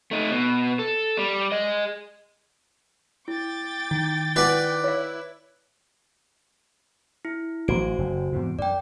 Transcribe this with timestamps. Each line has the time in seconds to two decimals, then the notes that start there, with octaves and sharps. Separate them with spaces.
0.11 A3 D#4
0.31 B2
0.79 A4
1.17 G3
1.52 G#4 D#5
3.28 E4 G5 D6 A6
3.91 D#3
4.36 E4 B4 D5 F#5 G#5
4.84 E4 C#5 F5
7.25 E4
7.68 A1 F#3 F#4 C5 D7
7.99 F#1 F#2
8.33 E2 G#2 C3
8.59 F#2 D5 G5